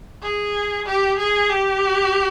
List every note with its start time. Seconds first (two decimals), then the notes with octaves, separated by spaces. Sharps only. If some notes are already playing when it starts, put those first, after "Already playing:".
0.22 G#4
0.86 G4
1.18 G#4
1.50 G4